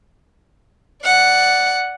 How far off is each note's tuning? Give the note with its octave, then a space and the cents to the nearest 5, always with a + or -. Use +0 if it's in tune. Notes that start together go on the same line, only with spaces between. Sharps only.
D5 +0 F#5 +0